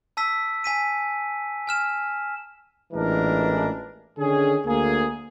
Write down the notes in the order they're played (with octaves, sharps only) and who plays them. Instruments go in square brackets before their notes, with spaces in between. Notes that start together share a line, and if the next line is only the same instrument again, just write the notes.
[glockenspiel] A5 E6 B6
G#5 B6 D#7
G#5 F6 E7
[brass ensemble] A1 A#2 E3 G#3 D4 A#4
D3 D#3 C#4 G#4
D2 A#3 G#4